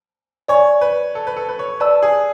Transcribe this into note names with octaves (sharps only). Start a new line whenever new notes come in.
C#5 D5 G#5 C#6
B4
A4
B4
A4
B4
C#5
B4 D5 A5 E6
G#4